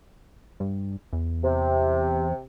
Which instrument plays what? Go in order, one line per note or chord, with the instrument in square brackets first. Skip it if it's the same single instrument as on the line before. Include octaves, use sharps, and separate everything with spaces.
[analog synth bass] G2
E2
[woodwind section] C3